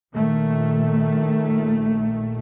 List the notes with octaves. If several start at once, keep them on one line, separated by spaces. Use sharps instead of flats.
A#1 A#2 D#3 A3